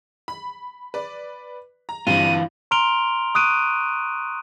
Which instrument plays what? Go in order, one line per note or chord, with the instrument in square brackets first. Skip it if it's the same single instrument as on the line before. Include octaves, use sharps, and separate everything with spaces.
[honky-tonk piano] B5
B4 D5
A#5
[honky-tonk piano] G2 G3 C4 [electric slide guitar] E3 F4 [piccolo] D#7
[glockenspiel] A#5 C6 F6 D7 F7 G7
C#6 D#6 F#6 D7 D#7